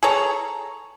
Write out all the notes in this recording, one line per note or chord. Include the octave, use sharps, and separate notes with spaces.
G#4 A4 C#5 A#5